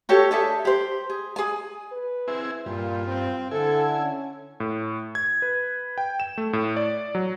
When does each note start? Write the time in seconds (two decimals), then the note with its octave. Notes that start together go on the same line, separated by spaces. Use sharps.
0.09 F#4 G4 A4 C#5
0.31 D4 G#4 A4 E5
0.65 G4 C5
1.10 G#4
1.36 G#4 G#5
1.92 B4
2.28 C4 E4 G#4
2.66 G2 A#2 F4
3.07 C4
3.51 D3 E4 A4 G#5
3.98 C#4
4.60 A2
5.15 G#6
5.42 B4
5.98 G5
6.20 E7
6.38 A3
6.53 A2
6.76 D5
7.15 F#3